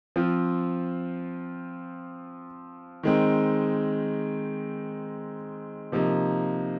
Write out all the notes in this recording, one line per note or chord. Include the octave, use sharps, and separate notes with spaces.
F3 C4 F4
D#3 G#3 C4 D#4
C3 F3 A#3 D#4